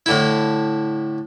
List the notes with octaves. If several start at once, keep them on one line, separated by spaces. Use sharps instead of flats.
A2 D3 E4